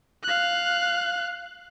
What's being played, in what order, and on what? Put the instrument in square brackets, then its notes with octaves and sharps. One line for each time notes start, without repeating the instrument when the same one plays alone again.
[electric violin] F5 F#6